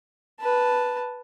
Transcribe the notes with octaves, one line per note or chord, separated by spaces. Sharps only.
B4 A5